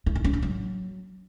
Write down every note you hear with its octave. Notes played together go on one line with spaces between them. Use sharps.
E4
D#4
C#4
D4
F#3